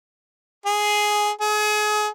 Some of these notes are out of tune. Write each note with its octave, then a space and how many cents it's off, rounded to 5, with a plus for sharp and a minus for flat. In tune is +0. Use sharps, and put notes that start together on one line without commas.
G#4 +5
G#4 +30